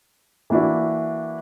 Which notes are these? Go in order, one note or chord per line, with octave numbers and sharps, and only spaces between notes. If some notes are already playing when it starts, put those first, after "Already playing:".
E3 A#3 D4 E4 F#4